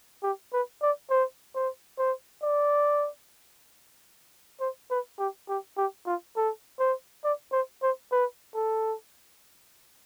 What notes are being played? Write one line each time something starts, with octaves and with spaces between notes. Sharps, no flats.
G4
B4
D5
C5
C5
C5
D5
C5
B4
G4
G4
G4
F4
A4
C5
D5
C5
C5
B4
A4